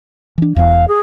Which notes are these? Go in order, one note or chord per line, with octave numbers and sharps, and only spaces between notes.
E3 D4
E1 E2 F5
G#4